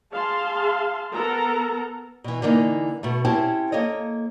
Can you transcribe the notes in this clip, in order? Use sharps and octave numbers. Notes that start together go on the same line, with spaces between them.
G#4 F5 A5 C6
B3 A4 A#4 A#5
B2 E3
D3 E3 A#3 D#4
B2 A3
C4 C#4 E4 G4 C5 A5
A#3 A4 C#5 D#5